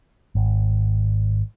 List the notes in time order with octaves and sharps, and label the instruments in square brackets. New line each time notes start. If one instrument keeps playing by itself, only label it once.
[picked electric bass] G#1